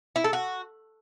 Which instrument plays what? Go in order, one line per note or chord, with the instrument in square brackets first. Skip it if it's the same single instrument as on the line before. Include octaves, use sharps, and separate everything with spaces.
[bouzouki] E4
A4
F#4